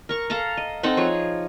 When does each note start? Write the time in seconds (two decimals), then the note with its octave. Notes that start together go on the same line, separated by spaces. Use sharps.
0.09 A#4 C#6
0.30 A4 F5 A5 A#5
0.57 D#5
0.83 C4 D#4 A4 F#5
0.97 F3 G#4 C#5